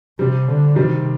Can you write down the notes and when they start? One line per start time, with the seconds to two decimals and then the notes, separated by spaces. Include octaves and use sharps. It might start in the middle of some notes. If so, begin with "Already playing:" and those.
0.19 C3 G3 C4 G4
0.48 D3
0.75 C3 D#3 G3 C4